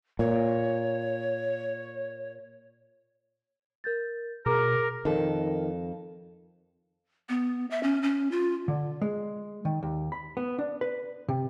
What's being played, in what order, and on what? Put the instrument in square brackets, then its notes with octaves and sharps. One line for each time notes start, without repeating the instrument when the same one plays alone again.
[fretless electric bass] A#2 [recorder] C#5
[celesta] A#4 G6 A6
[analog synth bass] B2 [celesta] G#4 A#5 D6 [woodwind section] A#4
[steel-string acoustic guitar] F2 A4 [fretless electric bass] D#3
[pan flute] B3
E5
C#4
C#4
F4
[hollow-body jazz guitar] D3
G#3
D#3
D#2
B5
B3
D4
B4
C3